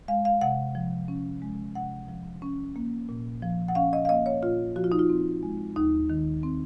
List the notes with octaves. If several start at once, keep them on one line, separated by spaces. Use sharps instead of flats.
G#3 F5
F5
C3 F#5
F3
C#4
G#3
C3 F#5
F3
C#4
A#3
A#2
F3
F#5
C#4 F5
D#5
F5
A#3 D#5
C#5
A#2 F4
F3 F#4
F4
D#4
F4
C4
G#3
D#2 D#4
D#3
C4